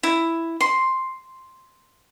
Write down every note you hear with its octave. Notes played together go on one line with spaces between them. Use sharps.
E4
C6